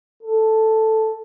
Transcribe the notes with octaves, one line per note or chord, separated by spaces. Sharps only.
A4